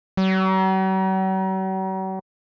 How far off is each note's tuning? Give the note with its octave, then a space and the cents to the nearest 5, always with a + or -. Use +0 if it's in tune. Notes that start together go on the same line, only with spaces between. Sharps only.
F#3 +45